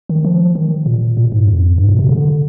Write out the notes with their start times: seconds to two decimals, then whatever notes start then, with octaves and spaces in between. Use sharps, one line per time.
0.09 D#3
0.25 F3
0.55 D#3
0.86 A#2
1.17 A#2
1.32 G#2
1.48 F2
1.78 G2
1.89 A#2
1.99 C3
2.09 D3